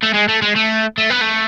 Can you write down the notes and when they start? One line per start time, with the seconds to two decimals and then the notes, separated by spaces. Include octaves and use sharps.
0.03 A3
0.14 G#3
0.28 A3
0.42 G#3
0.56 A3
0.98 A3
1.10 B3
1.21 A3